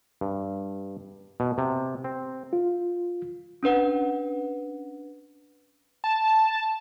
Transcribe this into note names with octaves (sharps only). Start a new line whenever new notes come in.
G2
B2
C3
C4
F4
C#4 D4 B4 F#5
A5